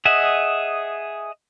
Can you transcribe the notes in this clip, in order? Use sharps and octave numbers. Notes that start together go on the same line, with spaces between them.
G#4 D#5 E5 F#5